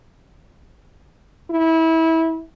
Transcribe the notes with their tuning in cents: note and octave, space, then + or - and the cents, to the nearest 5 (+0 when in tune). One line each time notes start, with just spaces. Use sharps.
E4 -25